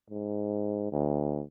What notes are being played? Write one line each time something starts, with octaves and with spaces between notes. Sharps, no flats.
G#2
D2